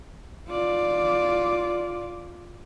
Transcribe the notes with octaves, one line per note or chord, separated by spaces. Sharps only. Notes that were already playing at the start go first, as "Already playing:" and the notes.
F4 D5